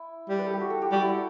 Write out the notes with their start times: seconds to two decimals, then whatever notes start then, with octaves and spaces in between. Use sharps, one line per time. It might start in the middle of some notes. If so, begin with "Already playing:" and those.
Already playing: E4
0.29 G3
0.39 B4
0.46 A4
0.53 G4
0.61 F#4
0.70 A4
0.82 G4
0.92 G3 F#4
1.02 E4